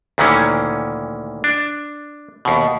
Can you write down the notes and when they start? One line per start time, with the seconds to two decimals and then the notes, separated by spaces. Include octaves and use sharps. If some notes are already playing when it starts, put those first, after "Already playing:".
0.18 D2 A#2 D#3 E3 C#4
1.44 D4
2.45 D#2 B2